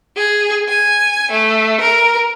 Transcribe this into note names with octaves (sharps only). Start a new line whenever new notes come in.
G#4
G#5
A3
A#4